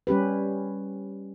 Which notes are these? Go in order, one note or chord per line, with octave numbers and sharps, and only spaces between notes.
G3 C#4 G4 B4